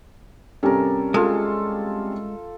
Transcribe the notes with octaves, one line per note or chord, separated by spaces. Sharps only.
C3 G3 C#4 A4 A#4
G#3 F4 A4